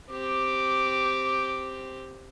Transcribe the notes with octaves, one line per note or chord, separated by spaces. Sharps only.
C4 G4 D6